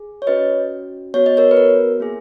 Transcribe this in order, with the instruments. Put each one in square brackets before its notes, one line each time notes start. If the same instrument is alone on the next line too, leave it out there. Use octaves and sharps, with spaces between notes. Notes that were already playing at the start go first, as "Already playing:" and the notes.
Already playing: [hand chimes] G#4
C#5
C#4 F#4 B4 D#5
B3 F#4 C#5
D#5
A#4 C#5
B4
A#4
A#3 E4 G#4